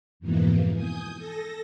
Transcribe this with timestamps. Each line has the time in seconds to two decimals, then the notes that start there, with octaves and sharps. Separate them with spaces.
0.20 F2 G#2 B2 E3 A#3
0.74 G#5 D#6 G6
1.16 A4 A#6